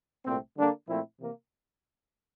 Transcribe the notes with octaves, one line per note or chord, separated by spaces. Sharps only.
C2 A#2 A3 C4
D3 G3 A#3 D4 A4
A#2 F3 A3 C4 E4
C3 E3 A#3